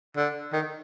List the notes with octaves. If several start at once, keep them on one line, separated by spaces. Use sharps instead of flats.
D3
D#3